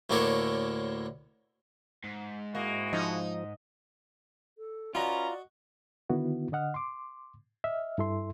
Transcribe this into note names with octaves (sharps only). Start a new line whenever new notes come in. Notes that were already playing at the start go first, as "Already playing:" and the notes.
D2 A2 A#3 D4 A4 C#5
G#2
G#3 A#3 E4 F#4
F3 D#4
A4
C#4 F4 F#4 B4 D5 D#5 A#5
D3 D#3 B3 E4 F#4
D3 D#5 F#5 F6
C6 D6
D#5 E5 F6
G2 E4 A4 E5 C6